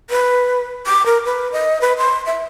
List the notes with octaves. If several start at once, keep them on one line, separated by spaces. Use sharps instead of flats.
B4
D6
A#4
B4
D#5
B4
C6
E5